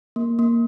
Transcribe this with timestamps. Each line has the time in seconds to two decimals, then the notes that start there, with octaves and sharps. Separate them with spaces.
0.16 A#3
0.39 A#3